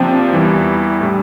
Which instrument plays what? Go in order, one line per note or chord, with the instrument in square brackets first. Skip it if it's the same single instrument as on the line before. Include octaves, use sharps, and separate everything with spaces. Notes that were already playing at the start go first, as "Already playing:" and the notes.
Already playing: [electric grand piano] C3 F3 A#3 D4 [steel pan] C4
[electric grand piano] E2 E3 G3
A2 G3 D4